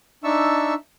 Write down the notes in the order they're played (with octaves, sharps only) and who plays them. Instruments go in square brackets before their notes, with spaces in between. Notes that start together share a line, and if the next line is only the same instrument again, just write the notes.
[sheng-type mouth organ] D4 D#4 E5 A5 C#6 E6